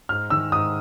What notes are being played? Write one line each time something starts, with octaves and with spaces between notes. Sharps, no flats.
G#2 F6
D#3 E6
G#2 D#6